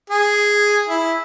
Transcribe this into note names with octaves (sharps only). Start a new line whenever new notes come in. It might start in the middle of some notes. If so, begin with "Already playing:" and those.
G#4
E4